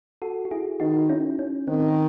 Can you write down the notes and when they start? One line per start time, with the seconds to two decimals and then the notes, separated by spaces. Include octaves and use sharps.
0.22 F#4 A4
0.45 F#4
0.51 E4 G#4
0.80 D#3 D#4 F#4
1.09 C#4 E4
1.39 C#4
1.68 D#3 C4